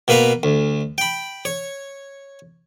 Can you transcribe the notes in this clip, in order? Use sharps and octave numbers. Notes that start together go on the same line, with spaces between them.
B2 A#3 B4 F5 A#5
D2
G5 B5
C#5